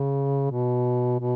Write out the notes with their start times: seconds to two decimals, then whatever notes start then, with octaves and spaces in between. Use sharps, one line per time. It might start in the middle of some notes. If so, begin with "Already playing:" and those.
Already playing: C#3
0.51 B2
1.19 B2